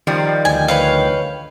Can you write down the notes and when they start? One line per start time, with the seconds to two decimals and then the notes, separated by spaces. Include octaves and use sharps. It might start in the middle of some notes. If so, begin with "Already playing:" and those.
0.07 D#3 F3 G3
0.45 D2 G5 G#5
0.68 B4 C#5 F5